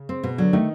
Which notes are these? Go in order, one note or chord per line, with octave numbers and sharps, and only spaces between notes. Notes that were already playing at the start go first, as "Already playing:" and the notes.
Already playing: C#3
C4
B2
D3 F#3 D4
D#3 A3 D#4